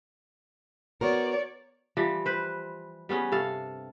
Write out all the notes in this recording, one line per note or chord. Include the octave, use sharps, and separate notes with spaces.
B3 F#4 A#4 C#5 D5
E3 F3 G3
B4 C5
G3 B3 C#4 G#4
G2 C3 A4 F5